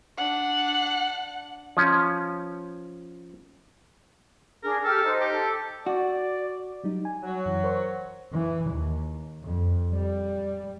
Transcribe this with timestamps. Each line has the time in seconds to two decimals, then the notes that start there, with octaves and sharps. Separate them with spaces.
0.18 D4 F#5
1.77 F3 C#4
4.63 D4 G#4 A#4
4.84 G4 A4 F6
5.04 D#4 C5
5.20 G4
5.32 A4
5.86 F#4 D5
6.84 F#3 G3 D#4
7.05 G#5
7.23 F#3
7.46 F#2 E3
7.64 A#4 C5 C#6
8.32 E3
8.71 D#2
9.43 F2
9.94 G3